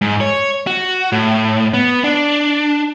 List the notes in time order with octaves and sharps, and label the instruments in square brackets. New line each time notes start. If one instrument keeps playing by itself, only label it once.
[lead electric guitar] G#2
C#5
F#4
A2
B3
D4